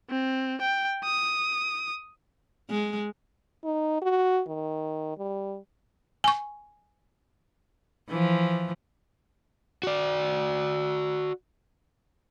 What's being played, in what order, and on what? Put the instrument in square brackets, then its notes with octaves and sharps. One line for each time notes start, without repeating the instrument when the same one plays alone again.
[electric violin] C4
G5
D#6
[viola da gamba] G#3
[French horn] D#4
F#4
D#3
G3
[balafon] G#5 C#6
[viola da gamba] E3 F3
[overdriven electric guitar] F#4 D5